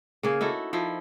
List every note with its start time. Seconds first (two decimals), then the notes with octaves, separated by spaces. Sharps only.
0.23 C#3 A#3 G#4
0.41 D#4 E4 F#4 A4
0.73 F3 D#4 E4